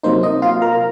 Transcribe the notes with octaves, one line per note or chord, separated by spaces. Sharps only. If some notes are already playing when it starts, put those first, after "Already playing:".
C3 F#3 A#3 D#4 C5
D#4 D#5
F4 F5
A#4 A#5